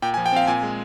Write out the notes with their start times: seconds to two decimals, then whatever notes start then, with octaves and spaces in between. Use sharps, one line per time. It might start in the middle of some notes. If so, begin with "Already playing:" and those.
0.02 A#2 G5
0.14 G#5
0.17 F3
0.26 G5
0.33 C4 F5
0.47 A#2 G#5
0.63 G#3